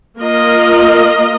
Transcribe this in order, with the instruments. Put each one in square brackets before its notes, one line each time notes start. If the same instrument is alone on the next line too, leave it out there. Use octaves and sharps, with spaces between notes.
[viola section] A#3 F4 A#4 D#5